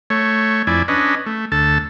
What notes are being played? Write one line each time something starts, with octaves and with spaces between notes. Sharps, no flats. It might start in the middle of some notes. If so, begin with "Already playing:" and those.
A3 C#5
F2 E4 D5 G#5
C#4 D4 B4 D#5
A3
D2 A4 A5